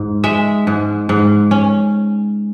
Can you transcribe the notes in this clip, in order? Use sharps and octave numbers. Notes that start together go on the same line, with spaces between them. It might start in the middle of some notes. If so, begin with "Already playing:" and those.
Already playing: G#2
G#3 E5
G#2
G#2
C#4